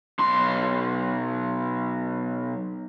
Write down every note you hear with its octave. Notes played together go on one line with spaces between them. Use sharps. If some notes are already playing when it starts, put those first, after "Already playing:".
B1 C6